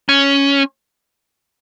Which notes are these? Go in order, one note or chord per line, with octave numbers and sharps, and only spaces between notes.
C#4